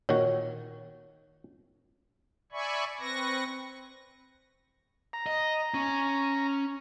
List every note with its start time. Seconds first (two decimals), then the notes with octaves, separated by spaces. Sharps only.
0.09 A#2 D#3 F#4 C#5
2.52 D5 E5 G#5 B5 C#6
3.00 C4 B4 C#6 A#6
5.13 A#5
5.26 D#5
5.74 C#4